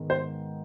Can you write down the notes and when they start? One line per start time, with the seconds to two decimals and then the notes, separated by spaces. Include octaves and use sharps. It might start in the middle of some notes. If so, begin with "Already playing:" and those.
Already playing: G#2 D#3 G#3 B3
0.10 C5